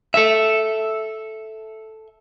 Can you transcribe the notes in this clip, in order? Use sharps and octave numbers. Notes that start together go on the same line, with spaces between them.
A4 E5